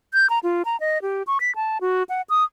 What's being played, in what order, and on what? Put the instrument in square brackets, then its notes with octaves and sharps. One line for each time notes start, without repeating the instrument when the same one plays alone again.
[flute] G6
A#5
F4
A#5
D#5
G4
C#6
B6
A5
F#4
F#5
D#6